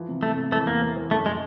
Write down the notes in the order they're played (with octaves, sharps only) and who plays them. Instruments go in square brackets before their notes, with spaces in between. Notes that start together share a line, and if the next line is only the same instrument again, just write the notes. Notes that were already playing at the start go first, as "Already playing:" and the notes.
Already playing: [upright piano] E3 F3
C3
[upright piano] C3 [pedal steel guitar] A3
[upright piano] C3
[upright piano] E3 [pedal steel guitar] A3
[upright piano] E2 [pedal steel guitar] A#3
[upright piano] E3
E3
[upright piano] F#2 [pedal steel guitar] A3
[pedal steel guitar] G#3